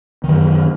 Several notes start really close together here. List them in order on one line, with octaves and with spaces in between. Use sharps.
D#3 F#2 E3